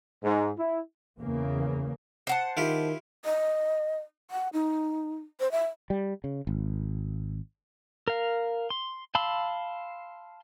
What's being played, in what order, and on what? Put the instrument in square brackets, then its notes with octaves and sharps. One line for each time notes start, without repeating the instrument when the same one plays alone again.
[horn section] G#2
E4
[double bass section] E2 C#3 A#3
[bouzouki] C5 F#5 A5
[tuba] D#3 [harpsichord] E4 F4 G4
[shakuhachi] D#5
F#5
D#4
C5
E5
[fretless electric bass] G3
C#3
G#1
[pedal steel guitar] A#4 F5
C6
F5 A5 B5 C6 E6